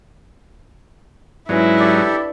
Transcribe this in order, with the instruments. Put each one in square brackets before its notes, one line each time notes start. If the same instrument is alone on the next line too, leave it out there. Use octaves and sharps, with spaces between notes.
[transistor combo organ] G#2 F#3 [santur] C#4 B4 D5 [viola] E4
[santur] D4 [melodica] G4 A4